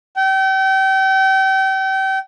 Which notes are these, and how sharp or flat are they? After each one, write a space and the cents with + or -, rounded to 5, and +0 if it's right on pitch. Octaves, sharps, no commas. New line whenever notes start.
G5 -35